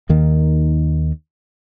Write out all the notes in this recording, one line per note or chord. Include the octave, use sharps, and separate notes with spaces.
D#2 D#3 A#3